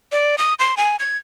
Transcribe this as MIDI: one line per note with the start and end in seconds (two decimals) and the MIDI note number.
0.12 0.36 74
0.38 0.54 87
0.59 0.75 84
0.77 0.96 80
1.00 1.17 92